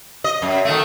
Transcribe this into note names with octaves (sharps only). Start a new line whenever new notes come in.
D#5
F#2
D#3 A3